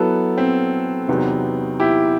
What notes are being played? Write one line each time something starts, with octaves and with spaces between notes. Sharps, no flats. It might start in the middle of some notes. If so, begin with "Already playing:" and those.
Already playing: F#3 B3 E4 A4
C4
E2 C3 F#3 B3 D#4
E4 G4